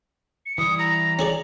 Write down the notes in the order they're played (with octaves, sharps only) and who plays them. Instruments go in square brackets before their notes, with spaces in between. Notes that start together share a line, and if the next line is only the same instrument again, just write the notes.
[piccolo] C#7
[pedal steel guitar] E3 G3 E4 [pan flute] D#6
[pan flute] A#5 [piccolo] A#6
[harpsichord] C#4 G#4 D5 [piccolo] F#7